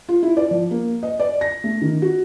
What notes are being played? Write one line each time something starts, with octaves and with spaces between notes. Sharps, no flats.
F4
E4
D5
F3
A#3
D#5
D5
A#6
A3
D#3
F#4